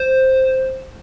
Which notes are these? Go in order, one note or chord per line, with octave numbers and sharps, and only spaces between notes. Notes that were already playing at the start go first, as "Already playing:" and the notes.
Already playing: C5